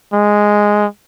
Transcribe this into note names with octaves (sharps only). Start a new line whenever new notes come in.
G#3